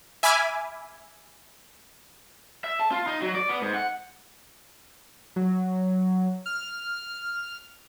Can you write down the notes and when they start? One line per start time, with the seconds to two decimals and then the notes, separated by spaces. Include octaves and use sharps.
0.23 E5 G#5 B5 D6 F6
2.64 E5
2.80 A5
2.91 F4
3.07 D#4
3.22 F#3
3.35 D5
3.49 B3
3.62 G#2
3.74 F#5
5.36 F#3
6.46 F6